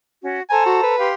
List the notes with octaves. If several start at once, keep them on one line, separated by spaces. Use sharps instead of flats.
C#4 F#4
A4 C5 G#5 A#5
F#4
B4
G4 F5 C6